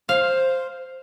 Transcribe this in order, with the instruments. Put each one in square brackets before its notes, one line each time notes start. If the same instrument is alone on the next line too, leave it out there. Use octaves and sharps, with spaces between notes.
[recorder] C5 [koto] F5